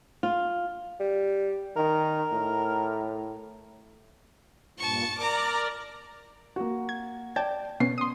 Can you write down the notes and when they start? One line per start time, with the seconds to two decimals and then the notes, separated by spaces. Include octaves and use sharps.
0.23 F4
0.99 G3
1.76 D#3 A#4
2.33 A2
4.79 G2 A#2 A5 C#6
5.18 A#4 D5 A#5 D6
6.56 A#3 F#4
6.89 G#6
7.36 D5 G5 A5 G#6
7.80 B2 B3 C#4 C7
7.98 C6 D#6